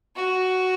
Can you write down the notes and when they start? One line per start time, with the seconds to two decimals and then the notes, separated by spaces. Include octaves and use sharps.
0.16 F#4